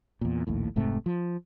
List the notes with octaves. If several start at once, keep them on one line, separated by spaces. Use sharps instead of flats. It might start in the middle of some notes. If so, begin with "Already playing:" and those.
E2 A#2
A#1 D#2 A2
F1 G#2 C3 A3
F3